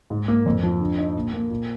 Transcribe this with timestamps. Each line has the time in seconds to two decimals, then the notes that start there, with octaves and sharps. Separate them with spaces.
0.10 G#2
0.28 A#3
0.46 F2
0.63 F3
0.80 D3
0.98 D#4
1.15 A#2
1.33 A#3
1.50 A#2